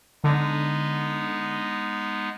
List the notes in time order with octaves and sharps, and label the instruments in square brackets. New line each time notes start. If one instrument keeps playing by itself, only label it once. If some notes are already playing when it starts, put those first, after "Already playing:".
[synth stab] D3 [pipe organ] G#3 B3 D#4